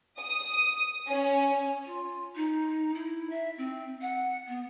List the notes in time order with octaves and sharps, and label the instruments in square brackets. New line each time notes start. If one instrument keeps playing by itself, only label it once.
[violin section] D#6
C#4
[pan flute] F4
D#4
E4
E5
C4
F#5
B3